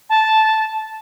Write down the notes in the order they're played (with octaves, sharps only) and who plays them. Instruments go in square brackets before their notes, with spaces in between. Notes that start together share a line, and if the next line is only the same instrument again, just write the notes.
[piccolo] A5